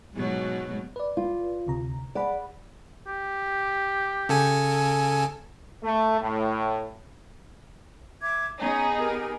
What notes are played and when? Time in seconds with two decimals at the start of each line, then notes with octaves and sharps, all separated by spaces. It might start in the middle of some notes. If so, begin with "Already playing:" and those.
0.14 G#2 B2 F#3
0.96 B4 D5
1.17 F4
1.67 D2 C3 A#5
2.15 G#4 D5 F#5 B5
3.07 G4
4.29 C#3 A4 G#5
5.84 A3
6.21 A2
8.21 E5 D6 G#6
8.60 B3 C#4 D#4 G#4
8.98 G4 A#4